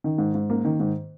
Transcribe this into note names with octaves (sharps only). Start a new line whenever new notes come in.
D#3
G#2
G#2
A#3
D#3
G#2